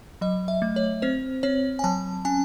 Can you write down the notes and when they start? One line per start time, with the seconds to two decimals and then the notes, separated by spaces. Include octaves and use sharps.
0.21 F#3 D#5
0.48 E5
0.62 A3
0.76 C#5
1.02 C4 C5
1.43 C4 C#5
1.79 G#5
1.84 F#3 A5
2.25 C#4 G#5